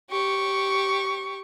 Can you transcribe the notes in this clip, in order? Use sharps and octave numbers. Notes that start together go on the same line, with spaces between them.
G4 C#6